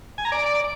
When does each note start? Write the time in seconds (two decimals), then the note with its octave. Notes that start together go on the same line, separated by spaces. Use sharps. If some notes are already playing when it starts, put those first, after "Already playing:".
0.18 G#5
0.25 A#5
0.32 D5